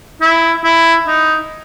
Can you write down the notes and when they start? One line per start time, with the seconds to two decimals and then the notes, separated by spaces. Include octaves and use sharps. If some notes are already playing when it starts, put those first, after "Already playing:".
0.21 E4
0.64 E4
1.07 D#4